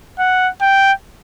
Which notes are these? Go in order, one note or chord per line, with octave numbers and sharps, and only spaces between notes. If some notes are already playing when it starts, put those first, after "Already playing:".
F#5
G5